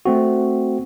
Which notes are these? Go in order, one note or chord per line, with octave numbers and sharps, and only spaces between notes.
A3 C4 F#4